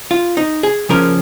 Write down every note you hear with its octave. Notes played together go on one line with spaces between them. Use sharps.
F4
D#4
G#4
C#3 F3 A#3 C#4 A#4